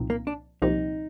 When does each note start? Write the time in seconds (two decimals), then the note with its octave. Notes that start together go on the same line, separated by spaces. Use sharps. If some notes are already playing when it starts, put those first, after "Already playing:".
Already playing: C2 A#2 F3 C4 D#4
0.10 A#3
0.27 D4
0.62 C2 A#2 F3 C4 D#4 G4